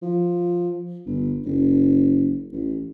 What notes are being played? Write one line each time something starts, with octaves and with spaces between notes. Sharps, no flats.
F3
G1
F#1
A1